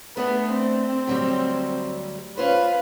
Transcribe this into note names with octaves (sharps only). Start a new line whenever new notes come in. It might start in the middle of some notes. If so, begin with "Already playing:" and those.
A3 B3 D4
C4
D2 F#3 G3
C#4 F4 B4 C5 F5